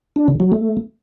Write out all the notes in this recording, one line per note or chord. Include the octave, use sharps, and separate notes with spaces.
D4
C#3
F#3
A3